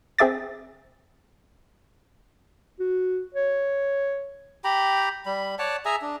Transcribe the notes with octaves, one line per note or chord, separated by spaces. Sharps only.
C4 G#4 E5 D6 A6
F#4
C#5
G4 G5 A#5 B5
G3 B5
C#5 D5 F#5 A5
G#4 E5 G#5 A#5
D4